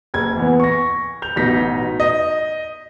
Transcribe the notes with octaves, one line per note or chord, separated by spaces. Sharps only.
F#1 G#6
E3 B3
C#6 A#6
G6 F7
A1 B2 D#4 A#6 B6
D#5